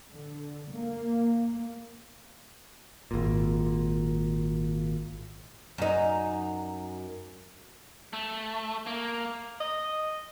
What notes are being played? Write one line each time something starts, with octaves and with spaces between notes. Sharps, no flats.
D3
A#3
G#1 A#2
F#2 D#4
A3
A#3
D#5